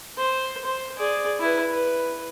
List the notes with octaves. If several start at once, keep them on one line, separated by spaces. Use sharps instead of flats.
C5
C5
G#4 D5
E4 B4
B4